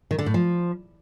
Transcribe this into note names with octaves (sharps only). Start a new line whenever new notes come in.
D#3
D3
A2
F3